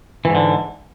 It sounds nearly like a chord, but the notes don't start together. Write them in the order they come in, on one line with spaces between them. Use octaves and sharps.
E3 G#2 D3